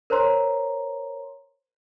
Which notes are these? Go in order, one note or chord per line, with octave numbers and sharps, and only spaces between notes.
A#4 C5 C#5 A#5 C6